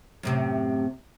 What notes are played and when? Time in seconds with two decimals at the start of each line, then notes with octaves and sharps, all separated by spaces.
0.23 F#2 A2 C3